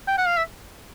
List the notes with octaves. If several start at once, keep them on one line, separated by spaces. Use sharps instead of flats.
G5
F#5
F5
E5